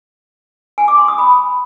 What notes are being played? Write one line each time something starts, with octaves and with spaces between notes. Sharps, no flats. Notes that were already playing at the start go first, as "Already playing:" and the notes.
G#5
D6
C6
D#6
B5